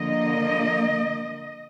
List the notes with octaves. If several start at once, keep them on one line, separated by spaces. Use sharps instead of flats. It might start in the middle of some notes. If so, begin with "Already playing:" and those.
Already playing: D3 F3 A#3 D#5